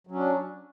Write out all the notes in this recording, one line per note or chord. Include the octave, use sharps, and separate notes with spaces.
F#3 C#4 D4